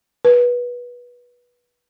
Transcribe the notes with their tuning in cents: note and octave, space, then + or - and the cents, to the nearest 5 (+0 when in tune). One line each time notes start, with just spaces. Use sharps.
B4 -20